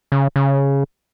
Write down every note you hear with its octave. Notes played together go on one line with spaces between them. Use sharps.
C#3
C#3